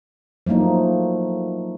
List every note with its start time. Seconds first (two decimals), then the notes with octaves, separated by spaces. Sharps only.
0.46 F3 F#3 A3 A#3 D#4